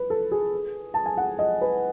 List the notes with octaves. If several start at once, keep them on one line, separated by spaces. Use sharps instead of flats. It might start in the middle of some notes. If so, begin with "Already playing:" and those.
Already playing: B4
A4
G#4
A5
G#5
F#5
D#5
B4